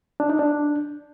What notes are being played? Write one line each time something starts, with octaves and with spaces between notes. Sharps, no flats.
D4
D#4
D4